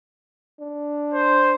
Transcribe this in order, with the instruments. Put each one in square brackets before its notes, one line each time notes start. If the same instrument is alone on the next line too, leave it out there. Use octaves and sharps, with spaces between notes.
[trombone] D4
[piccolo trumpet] C5